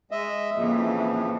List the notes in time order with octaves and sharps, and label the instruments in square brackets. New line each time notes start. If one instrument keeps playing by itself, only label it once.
[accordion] G#3 D#5 E5
[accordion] F2 C#3 F3 [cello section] A#2 E3